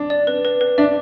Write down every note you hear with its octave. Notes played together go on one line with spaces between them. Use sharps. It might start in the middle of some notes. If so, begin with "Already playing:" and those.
Already playing: D4
D5
B4
B4
B4
D4 E5